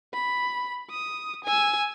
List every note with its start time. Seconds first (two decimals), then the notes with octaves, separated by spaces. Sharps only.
0.14 B5
0.90 D#6
1.44 G#5 E6